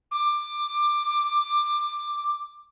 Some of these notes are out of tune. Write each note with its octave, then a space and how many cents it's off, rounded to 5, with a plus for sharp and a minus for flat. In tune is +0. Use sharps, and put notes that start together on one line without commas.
D6 +15